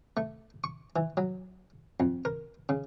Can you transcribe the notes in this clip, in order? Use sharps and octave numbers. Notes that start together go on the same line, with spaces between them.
A3
C#6
E3
F#3
F2
A#4
C#3